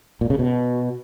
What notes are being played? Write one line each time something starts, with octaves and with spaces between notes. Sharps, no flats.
A#2
C#3
B2